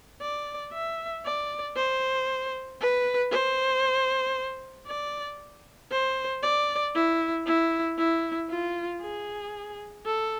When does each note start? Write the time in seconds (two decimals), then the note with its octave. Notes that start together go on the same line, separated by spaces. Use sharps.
0.21 D5
0.73 E5
1.25 D5
1.76 C5
2.81 B4
3.32 C5
4.87 D5
5.91 C5
6.43 D5
6.95 E4
7.46 E4
7.98 E4
8.50 F4
9.01 G#4
10.06 A4